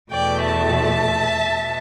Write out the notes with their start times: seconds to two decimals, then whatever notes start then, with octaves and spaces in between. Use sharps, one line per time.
0.12 E2 B2 A3 D5 G5
0.46 E5 A5
1.48 B2